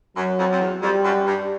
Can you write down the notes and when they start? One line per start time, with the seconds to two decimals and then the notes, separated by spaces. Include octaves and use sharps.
0.16 F#2 F#3
0.38 F2
0.51 F2
0.61 E2
0.82 F2 G3
1.04 F#2
1.26 G2